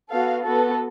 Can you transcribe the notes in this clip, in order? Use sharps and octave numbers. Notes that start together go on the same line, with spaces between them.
B3 F#4 A4 F5
B3 F#4 A4